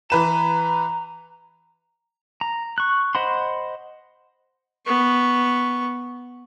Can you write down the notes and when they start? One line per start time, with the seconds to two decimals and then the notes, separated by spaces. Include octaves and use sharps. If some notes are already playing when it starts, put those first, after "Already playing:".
0.10 E3 B4 A#5 E7
2.41 A#5
2.78 C#6 F#6
3.15 C5 D#5 F#5 B5 C6
4.86 B3 C#6